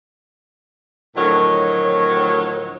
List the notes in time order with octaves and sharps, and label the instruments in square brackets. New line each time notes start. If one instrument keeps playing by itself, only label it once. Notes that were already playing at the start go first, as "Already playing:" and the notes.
[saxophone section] D2 A2 D#3 F3 F#3 C#5